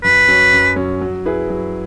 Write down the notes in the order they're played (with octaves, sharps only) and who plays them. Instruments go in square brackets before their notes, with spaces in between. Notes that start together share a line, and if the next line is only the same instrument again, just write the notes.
[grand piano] F#2 [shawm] B4
[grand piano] F#3 C#4
F#2
F#3 C#4
F#3
E4 G#4 B4
F#3